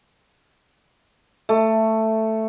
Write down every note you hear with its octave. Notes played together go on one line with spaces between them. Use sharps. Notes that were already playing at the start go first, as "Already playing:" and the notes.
A3